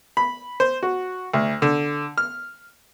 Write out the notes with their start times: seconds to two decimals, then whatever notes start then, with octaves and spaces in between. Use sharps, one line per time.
0.17 B5
0.60 C5
0.83 F#4
1.34 D2
1.62 D3
2.18 F6